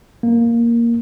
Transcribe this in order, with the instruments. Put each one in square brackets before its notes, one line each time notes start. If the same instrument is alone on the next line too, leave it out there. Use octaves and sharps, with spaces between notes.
[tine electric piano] A#3